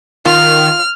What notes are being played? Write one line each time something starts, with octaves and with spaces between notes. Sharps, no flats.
D#3 F4 F6